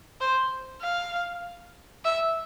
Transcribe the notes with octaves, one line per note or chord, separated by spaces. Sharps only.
C5
F5
E5